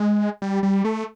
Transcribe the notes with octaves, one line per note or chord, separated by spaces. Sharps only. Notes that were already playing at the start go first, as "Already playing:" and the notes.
Already playing: G#3
G3
G3
A3